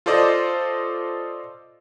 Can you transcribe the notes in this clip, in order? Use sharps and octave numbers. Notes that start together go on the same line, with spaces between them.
F4 A4 C5 D5 D#5